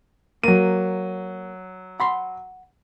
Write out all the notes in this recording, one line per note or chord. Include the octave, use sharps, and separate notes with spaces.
F#3 A#3 D#7
F#5 B5 C6